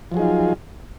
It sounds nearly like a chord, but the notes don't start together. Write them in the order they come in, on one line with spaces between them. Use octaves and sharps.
F3 F#3 G#4 D#4 F4